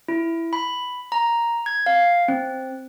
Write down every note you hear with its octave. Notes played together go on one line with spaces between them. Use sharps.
E4
B5
A#5
G#6
F5
C4